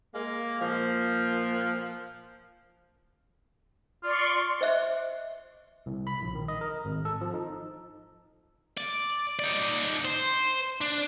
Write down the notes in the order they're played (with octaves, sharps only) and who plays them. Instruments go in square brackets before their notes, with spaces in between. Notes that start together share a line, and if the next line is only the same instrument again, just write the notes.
[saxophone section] G#3 A#3
A#2 F3
[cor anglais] F4 [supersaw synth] D5 C6 C#6
[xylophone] C5 D#5 E5 F#6
[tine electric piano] C2
B5
A#1
D#3
D#5
A#4
G#1
A4
F3
D#4
[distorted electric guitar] D5
D#4 D5
C5
D4